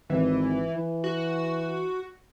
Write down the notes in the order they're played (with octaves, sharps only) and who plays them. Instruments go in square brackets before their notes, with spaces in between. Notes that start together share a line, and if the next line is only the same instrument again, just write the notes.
[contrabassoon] G#1 [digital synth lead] E3
[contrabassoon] E3
[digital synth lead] F#4